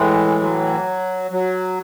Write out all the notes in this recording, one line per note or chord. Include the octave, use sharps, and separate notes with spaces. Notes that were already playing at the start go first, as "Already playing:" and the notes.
Already playing: A2 E3 G#3
F#3
F#3